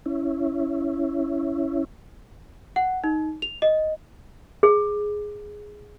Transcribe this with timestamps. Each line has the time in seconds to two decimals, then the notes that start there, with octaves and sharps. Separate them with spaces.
0.06 C#4 E4
2.76 F#5
3.04 D#4
3.42 F7
3.62 D#5
4.63 G#4